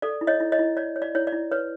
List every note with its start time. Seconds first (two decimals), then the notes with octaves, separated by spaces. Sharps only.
0.02 A4 D5
0.21 E4
0.27 C#5 D#5
0.40 E4
0.52 C#5 D#5
0.59 E4
0.77 C#5 D5
0.96 C#5
1.02 D5
1.15 E4 C#5
1.27 D5
1.32 E4
1.52 B4 C#5